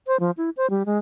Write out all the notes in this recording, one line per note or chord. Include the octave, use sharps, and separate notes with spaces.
C5
F3
E4
C5
G3
G#3